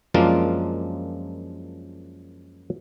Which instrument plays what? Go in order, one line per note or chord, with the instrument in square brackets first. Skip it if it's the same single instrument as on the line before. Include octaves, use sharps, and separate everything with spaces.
[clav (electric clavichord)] F#2 F3 G#3 A#3 D4 F4